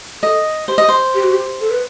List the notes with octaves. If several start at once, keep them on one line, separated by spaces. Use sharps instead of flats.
A4 D#5
G4 C5
D#5
C5
G4
F#4
G4
A4
B4